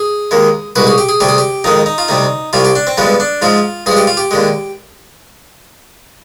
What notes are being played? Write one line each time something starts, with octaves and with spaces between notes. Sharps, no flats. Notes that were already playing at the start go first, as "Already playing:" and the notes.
Already playing: G#4
D#2 D#3 G#3
C2 B2 G#3 B4
G#4
G4
G#4
D2 C3 G3 G4
G#4
G4
F2 D#3 G#3 D#4
D#4
F4
D2 C3 G3 D#4
C2 C3 G3 F4
G4
D4
C4
G2 D3 F3 G#3 B3
D4
G#2 F3 G#3 F4
G2 F3 G#3 G#4
G4
F4
G4
D#2 D3 G#3